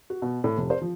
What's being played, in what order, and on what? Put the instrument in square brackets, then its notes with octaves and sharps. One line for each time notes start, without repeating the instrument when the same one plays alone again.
[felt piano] F#4
B2
A2
F1
C5
F3